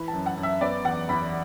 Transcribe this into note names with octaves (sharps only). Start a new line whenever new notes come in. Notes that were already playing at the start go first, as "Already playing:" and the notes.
Already playing: E3 B4
A5
F#2
F#5
F#2
E5
B3 D5
E2 F#5
E2 B5